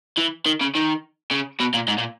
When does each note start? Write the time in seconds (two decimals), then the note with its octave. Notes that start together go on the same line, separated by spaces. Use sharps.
0.17 E3
0.46 D#3
0.61 C#3
0.75 D#3
1.31 C#3
1.60 B2
1.74 A#2
1.88 G#2
1.98 A#2